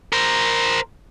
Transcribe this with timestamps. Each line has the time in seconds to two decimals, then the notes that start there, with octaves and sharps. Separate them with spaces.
0.13 A#4 C5